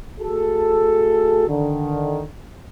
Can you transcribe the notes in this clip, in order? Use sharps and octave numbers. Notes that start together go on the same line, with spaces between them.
A3 F#4 G#4 A4
D3 D#3